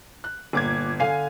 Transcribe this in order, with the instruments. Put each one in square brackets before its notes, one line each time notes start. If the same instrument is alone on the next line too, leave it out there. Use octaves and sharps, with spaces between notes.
[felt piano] F#6
[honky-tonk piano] G1 D6 G#6 [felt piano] A#2
[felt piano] D3 F5 C7 [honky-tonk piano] G#5